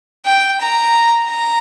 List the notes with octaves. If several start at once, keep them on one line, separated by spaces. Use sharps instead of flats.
G5
A#5
A#5